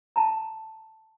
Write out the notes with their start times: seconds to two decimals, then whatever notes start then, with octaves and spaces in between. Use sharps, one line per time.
0.16 A5 A#5